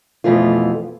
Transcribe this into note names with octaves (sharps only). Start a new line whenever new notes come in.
F2 B2 E3 A3 F4